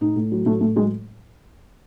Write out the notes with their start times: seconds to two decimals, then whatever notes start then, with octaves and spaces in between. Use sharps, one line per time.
0.01 A2 D#4
0.16 A2
0.32 F#3
0.46 A2 A3
0.61 A2 A3
0.75 F#3 G#3